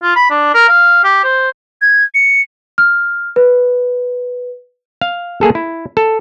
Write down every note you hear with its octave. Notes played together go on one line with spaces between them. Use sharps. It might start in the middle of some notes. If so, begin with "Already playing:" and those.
F4
B5
D4
A#4
F5
G4
C5
G#6
C#7
F6
B4
F5
A#3 G#4 A4
E4
A4